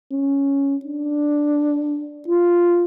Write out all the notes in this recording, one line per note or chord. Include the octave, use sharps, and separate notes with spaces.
C#4
D4
F4